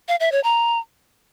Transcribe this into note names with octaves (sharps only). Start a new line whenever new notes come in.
F5
E5
C#5
A#5